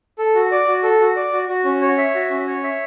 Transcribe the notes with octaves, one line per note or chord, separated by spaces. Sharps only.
A4
F#4
D5
F#4
A4
F#4
D5
F#4
F#4
C#4
C#5
E5
F#4
C#4
C#5
E5